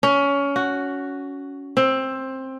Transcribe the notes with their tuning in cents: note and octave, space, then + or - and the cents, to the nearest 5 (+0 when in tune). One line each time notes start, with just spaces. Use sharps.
C#4 +20
F#4 +5
C4 +15